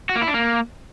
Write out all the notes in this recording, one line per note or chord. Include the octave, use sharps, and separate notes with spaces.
F#4
A#3
E4
D4
A#3